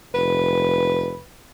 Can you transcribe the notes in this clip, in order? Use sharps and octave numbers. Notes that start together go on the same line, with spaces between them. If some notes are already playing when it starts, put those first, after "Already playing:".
F1 B4